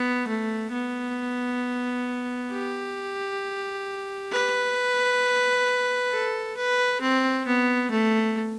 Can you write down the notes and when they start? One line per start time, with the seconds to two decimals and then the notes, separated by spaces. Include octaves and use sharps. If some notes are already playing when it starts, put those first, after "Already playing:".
Already playing: B3
0.28 A3
0.72 B3
2.52 G4
4.32 B4
6.11 A4
6.57 B4
7.01 C4
7.46 B3
7.91 A3